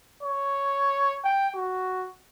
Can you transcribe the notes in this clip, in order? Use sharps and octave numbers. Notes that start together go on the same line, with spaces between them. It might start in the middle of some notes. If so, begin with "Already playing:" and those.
C#5
G5
F#4